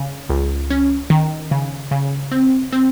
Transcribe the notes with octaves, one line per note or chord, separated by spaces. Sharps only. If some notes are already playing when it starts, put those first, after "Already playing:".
Already playing: C#3
C#2
C#4
D#3
C#3
C#3
C4
C4